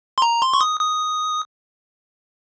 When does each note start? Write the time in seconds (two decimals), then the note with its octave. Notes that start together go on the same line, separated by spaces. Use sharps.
0.18 C6
0.22 A#5
0.42 C6
0.54 C#6
0.61 D#6
0.80 D#6